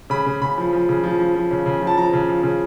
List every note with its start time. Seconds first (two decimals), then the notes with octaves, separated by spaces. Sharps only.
0.10 C#3 B5
0.26 C#3
0.41 C#3 B5
0.58 F3
0.73 F3
0.89 C#3
1.03 F3
1.19 F3
1.35 F3
1.51 C#3
1.66 C#3
1.82 F3
1.87 A5
1.97 F3 A#5
2.13 C#3
2.28 F3
2.43 C#3